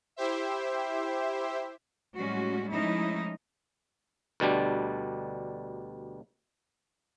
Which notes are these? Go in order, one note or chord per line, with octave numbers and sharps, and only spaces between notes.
E4 G4 C5 E5
A2 G3 G#3 C#4 F#4
F3 G#3 A3 C#4 D#4 E4
D2 B2 G3 D4